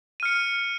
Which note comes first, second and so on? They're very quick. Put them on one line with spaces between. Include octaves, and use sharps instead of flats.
D#7 F6 C#7